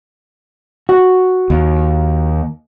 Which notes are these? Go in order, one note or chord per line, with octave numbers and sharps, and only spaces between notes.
F#4
D#2